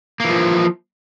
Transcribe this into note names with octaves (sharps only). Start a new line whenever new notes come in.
E3 F3 A#3